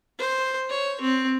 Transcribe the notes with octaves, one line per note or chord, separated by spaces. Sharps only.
C5
C#5
C4